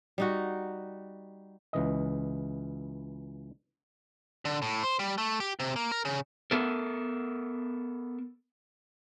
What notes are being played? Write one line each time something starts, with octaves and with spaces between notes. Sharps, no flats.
G3 D#4 F#4
C#2 E3 D#5
D3
A2
C5
G3
A3
G4
C3
A#3
A#4
C#3
B3 A4 A#4